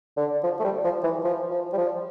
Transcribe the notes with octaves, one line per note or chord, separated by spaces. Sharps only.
D3
F3
A3
G3
F3
E3
F3
F3
G3
F3